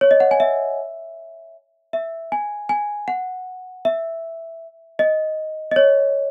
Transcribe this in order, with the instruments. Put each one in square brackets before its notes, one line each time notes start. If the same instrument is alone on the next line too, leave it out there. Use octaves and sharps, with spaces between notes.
[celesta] C#5
D#5
F#5
G#5
E5
E5
G#5
G#5
F#5
E5
D#5
D#5
C#5